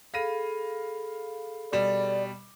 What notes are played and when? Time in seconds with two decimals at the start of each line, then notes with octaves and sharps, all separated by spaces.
0.14 G#4 A4 F5 B5 A#6 D#7
1.73 B2 G3 D5 E7